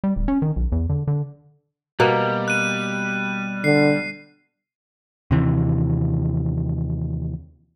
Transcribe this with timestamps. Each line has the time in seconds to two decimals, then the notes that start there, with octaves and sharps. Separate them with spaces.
0.04 G3
0.16 D1
0.28 C#4
0.42 D#3
0.56 B1
0.72 E2
0.89 D3
1.07 D3
2.00 B2 G3 A#3
2.48 F#6 D#7
3.64 D3 C7
5.31 D#2 C3 E3